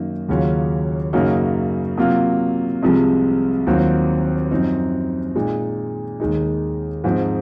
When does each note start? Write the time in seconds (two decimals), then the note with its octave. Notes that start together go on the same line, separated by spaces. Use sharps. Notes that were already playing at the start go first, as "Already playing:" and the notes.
Already playing: F#2 D#3 A#3 D#4
0.29 D#2 C#3 F#3 C#4 F4
1.13 F#2 C#3 F#3 A#3 D#4
1.97 C3 F#3 A#3 F4
2.82 C2 C3 F3 G#3
3.67 D#2 D#3 F#3 C4 F4
4.51 F#2 F3 C4 D#4
5.35 A#2 G#3 D#4
6.20 D#2 D#3 G#3 D#4
7.04 G#2 F3 C4 D#4